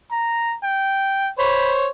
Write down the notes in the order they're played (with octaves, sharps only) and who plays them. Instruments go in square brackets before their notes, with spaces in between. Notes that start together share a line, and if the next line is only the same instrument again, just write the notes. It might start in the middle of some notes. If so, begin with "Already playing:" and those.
[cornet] A#5
G5
[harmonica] C5 C#5 [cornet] B5